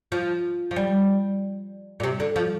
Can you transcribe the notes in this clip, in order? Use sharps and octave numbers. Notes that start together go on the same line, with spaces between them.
F3
F3
G3
A#2
C3
D3
F3